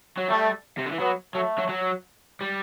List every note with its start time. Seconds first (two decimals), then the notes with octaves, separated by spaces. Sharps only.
0.17 F#3
0.28 G3 A3
0.78 C3
0.85 D3
0.92 E3
0.99 F#3 B3
1.34 F#3 A3
1.58 F#3
1.69 F#3
2.41 G3